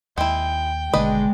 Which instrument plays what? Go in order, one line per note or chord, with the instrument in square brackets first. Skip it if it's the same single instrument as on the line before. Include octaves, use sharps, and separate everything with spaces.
[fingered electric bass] D#2 [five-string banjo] G#3 E4 [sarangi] G5
[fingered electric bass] G#1 B2 D3 [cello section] G#3 [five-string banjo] D4 B4 D#5